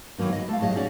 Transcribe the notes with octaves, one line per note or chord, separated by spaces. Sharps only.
D#3 E3 F#3 A#3 D#4
D#5
A3 F5
A2 F#3 G#4 D#5
C#4 D#4 F#4 C#5 D5